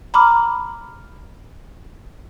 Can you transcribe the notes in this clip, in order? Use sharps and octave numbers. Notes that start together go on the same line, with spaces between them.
A#5 B5 D6 F6